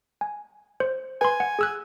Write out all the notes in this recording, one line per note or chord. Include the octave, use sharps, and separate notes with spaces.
G#5
C5
B4 G#5 C6
F#5
G#4 E6 F#6